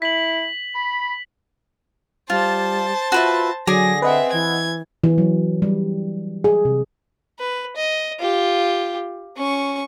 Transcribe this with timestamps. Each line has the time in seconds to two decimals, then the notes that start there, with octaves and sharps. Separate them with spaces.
0.02 E4 B6 F#7
0.75 B5
2.30 G3 F4 C5 A5
3.12 F4 F#4 B4 E5
3.67 D3 F#3 G#4 G#5 D6 A#6
4.02 C4 B4 D#5 E5 F#5
4.32 E3 G#6
5.04 E3
5.18 F#3
5.62 G3
6.44 G#4
6.65 C3
7.39 B4
7.76 D#5
8.20 F4 G4
9.37 C#4 C#6